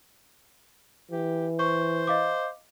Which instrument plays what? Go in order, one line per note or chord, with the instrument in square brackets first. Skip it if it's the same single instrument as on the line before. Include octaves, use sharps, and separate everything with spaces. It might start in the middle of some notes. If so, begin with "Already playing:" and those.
[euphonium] E3 [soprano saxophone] G4
[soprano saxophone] C5 [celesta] C#6
[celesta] D#5 F5 D6